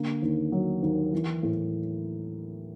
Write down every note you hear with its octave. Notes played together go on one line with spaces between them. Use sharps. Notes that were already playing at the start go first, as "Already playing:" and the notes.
Already playing: D3 A#3
D#2
F#3
D#2
E3
A2